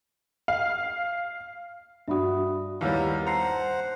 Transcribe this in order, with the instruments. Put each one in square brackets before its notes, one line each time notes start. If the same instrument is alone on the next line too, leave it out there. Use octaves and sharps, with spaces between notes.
[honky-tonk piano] F5
[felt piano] G2 F#4 [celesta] E5 B5 D#6
[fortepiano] D#2 G3 [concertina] A#3 B3 F5 [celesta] E4 C#5
[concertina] C5 F#5 [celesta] A5 C7 C#7 [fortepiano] A#5